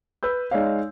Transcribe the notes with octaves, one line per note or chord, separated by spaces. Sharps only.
B4 E6 G6
G#3 D#4 C#5 D5 F5